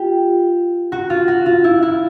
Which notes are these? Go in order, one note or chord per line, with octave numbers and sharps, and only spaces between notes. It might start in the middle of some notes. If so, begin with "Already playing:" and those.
Already playing: F4 G4
F#4
F4
F#4
F4
E4
E4